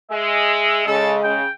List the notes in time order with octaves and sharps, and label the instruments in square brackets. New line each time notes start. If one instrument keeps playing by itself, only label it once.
[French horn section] G#3 G#4 [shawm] E5
[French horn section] C#3 [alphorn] G#3 [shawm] A4
[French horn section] C#3 [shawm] G5